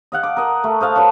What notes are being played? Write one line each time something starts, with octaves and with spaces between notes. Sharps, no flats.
D#5 F5 F#5
D6
A#4 D#5
A3
C5 D#5 F5 A5
F#4 B4 C#5